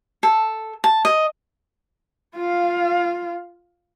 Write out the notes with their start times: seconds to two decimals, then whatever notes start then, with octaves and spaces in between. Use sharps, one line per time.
0.23 A4
0.84 A5
1.05 D#5
2.35 F4 F5